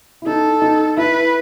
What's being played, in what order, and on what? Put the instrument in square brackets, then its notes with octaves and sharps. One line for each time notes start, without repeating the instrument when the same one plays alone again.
[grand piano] E4
[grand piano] D#4 [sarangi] A4
[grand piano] D#4
[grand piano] E4 [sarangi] B4